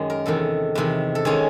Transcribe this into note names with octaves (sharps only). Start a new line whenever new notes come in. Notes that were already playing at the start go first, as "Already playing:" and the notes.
Already playing: F#2 D#3 G#3
A#4
E2 C3 D#3 A4
E2 C3 D#3
A4
D#3 G#3 C#4 G#4